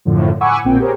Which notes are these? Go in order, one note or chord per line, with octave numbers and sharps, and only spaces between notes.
F#2 A2 D3 F3
F#5 G#5 B5 C#6 D6 E6
A#1 A#2 C4 G5
G4 G#4 A#4 C5 C#5